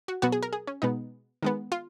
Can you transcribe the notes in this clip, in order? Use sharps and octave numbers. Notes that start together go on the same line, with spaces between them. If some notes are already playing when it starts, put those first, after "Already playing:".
F#4
B2 F#3 B3 F#4
G#4
A#4
G#4
C#4
B2 G#3 B3 D#4
D#3 G#3 B3
F4